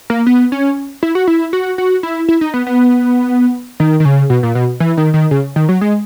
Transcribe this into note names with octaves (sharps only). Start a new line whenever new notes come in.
A#3
B3
C#4
E4
F#4
E4
F#4
F#4
E4
E4
D#4
B3
B3
D#3
D#3
C#3
B2
A#2
B2
E3
D#3
D#3
C#3
D#3
F#3
G#3